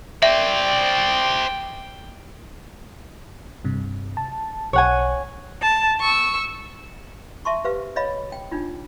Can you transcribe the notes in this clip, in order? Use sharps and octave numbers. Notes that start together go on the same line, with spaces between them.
C5 D5 E5 G5
G2 C3
A5
B1 C#5 F#5 G#5
A5
C#6 E6
E5 A5 C6 C#6
G4 B4 C5 F5
C#5 D#5 F5 B5
G5
D4 D#4 F4